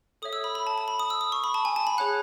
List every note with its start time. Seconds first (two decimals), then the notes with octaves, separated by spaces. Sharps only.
0.22 A4 C#5 E5 D#6
0.33 E6
0.44 B5
0.55 B5
0.67 A5
0.78 A5
0.88 B5
1.00 D#6
1.10 E6
1.21 D#6
1.32 C#6
1.44 B5
1.54 A5
1.65 G#5
1.76 A5
1.87 B5
1.98 G#4 C#5 F#5 F#6